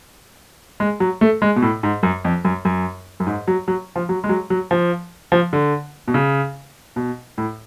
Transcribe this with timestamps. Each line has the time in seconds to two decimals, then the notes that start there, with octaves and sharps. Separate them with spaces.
0.80 G#3
1.00 F#3
1.21 A3
1.42 G#3
1.56 B2
1.62 A2
1.83 G#2
2.03 F#2
2.25 F2
2.45 F#2
2.65 F#2
3.20 F#2
3.27 G#2
3.48 F#3
3.68 F#3
3.96 F3
4.09 F#3
4.24 G#3
4.29 F#3
4.50 F#3
4.71 F3
5.32 F3
5.53 D3
6.08 B2
6.14 C#3
6.96 B2
7.38 A2